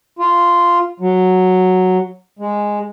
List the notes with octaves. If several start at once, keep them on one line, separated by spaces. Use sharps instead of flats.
F4
F#3
G#3